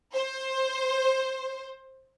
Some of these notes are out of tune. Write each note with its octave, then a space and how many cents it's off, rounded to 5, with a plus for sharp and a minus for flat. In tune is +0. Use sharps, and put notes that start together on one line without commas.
C5 +15